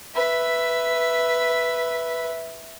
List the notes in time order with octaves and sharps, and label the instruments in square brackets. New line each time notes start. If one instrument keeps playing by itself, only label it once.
[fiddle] B4 E5